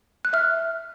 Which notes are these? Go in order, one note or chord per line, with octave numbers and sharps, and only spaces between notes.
F#6
E5 F6